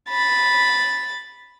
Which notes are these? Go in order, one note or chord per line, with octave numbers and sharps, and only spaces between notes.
B5 A6